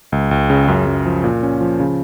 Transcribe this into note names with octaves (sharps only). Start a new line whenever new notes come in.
C#2
C#2
C#3
F#2
F#2
F3
A#2
C#4
F3
C#3